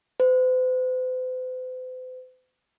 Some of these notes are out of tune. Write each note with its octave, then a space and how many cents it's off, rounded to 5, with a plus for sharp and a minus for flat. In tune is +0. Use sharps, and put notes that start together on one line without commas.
C5 -45